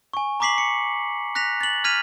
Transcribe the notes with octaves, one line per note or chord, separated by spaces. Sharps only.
G#5 C#6
A#5 C#6 D6 B6 C7 F#7
C#7
F#6 A#6 B6 F7
A6 F#7
F6 G#6 B6 D#7 F7